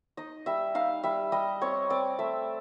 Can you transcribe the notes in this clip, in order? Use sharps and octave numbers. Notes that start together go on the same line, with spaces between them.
D#4 D#5
G3 E5
D#4 F5
G3 E5
G3 D#5
C4 C#5
C4 D5
A3 E5